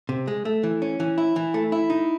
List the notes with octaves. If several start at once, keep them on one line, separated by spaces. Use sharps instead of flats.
C3
G#3
A3
E3
C#4
E3
E4
E3
A3
E4
D#4